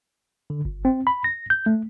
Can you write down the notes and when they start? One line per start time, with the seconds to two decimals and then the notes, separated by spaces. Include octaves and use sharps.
0.50 D3
0.65 G1
0.85 C4
1.07 B5
1.24 A#6
1.50 G6
1.66 A3